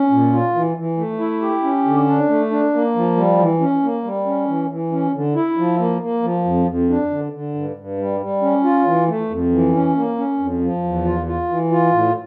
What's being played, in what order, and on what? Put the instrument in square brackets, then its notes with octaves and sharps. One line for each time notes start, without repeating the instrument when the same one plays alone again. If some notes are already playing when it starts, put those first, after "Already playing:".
Already playing: [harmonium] C#4
A#2
F4
E3
E3
A3
E4
G4
C#4
D3
D4
A3
D4
A#3
F3
G3
E3
C#4
A#3
G3
C#4
E3
E3
C#4
D3
E4
F3
A#3
A#3
F3
F2
F2
D4
D3
D3
G2
G2
G3
G3
C#4
F4
E3
A3
F2
E3
C#4
A#3
C#4
F2
F3
E2
F4
F4
E3
F4
A2